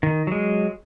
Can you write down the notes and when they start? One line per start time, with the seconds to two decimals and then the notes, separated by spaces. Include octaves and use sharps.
0.03 D#3
0.27 F#3 G#3